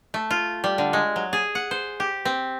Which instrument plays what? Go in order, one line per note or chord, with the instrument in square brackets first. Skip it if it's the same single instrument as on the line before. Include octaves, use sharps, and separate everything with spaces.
[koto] A3
F4
G3
D3
G#3
F#3
G#4
F#5
C5
G4
C4